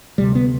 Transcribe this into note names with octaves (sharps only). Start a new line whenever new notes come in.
D2 C3 G3
B3